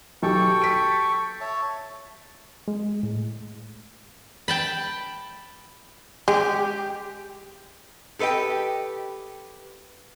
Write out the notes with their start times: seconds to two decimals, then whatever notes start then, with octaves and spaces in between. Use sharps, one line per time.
0.23 B1 G4 A4 G5 C#6
0.62 B6 D7
1.41 C#5 E5 A5
2.68 G#3
3.03 A2
4.48 G5 A5 B5
6.28 G#3 G4
8.19 G4 A4 B4 D#5 G5